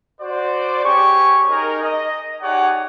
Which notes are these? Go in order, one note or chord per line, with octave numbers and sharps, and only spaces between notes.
F#4 C5 D5
C#4 G4 G#4 C#6
D#4 G#4 A#4
D#5
D#4 G4 G#4 C#5 D5 F#5